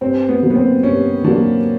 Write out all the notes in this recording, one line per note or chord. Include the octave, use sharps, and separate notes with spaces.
G2 C4
B3
D3 F#3 A#3
B3
C4
G2 C#4
D3 F#3 A#3 D4